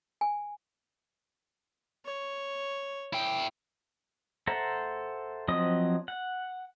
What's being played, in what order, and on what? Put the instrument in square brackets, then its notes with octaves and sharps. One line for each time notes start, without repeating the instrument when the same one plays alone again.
[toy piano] G#5
[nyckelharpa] C#5
[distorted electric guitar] E4 G5
[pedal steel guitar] A4 C5 E5 F#5 A#5
F3 F#3 C4 D#5 D#6
F#5